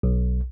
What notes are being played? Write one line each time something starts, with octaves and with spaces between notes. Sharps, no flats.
B1